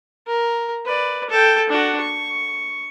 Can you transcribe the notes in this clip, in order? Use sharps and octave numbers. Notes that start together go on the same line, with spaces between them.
A#4
B4 D5
A4 G5
D4 F#4
C#6